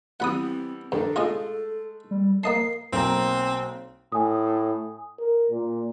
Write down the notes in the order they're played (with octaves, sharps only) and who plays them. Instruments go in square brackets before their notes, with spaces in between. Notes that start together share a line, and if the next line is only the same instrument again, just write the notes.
[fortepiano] E3 G3 B3 [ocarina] C4 [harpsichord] F#5 B5 D#6
[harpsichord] G2 [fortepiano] D#3 D4 D#4 [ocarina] A4
[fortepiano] G#3 A3 [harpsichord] F4 G#4 D#5
[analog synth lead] G3
[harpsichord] A#3 D#5 A5 [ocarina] A#4 [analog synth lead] C7
[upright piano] B1 A#3 A#5 [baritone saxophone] C4
[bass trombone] A2 [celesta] G#5 D#6
[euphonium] A#4
A#2